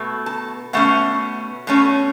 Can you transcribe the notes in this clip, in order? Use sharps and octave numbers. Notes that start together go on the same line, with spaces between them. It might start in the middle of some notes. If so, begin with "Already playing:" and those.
Already playing: B2 A3
A5
B2 A3 C#4 F#5
B2 A3 C#4